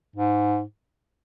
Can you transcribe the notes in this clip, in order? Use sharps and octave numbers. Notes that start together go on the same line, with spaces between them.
G#2